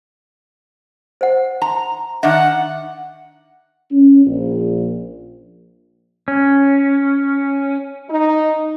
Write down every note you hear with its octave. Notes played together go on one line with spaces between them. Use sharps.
C5 F#5
A#5
D#3 D4 E5 F#5
C#4
A#1
C#4
D#4